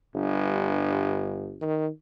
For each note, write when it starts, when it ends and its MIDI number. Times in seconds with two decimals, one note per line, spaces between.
0.15 1.63 31
0.15 1.50 43
1.62 1.88 51